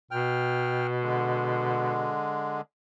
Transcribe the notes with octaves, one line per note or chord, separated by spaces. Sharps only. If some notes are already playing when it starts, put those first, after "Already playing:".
B2 G5 F6
D3 G#3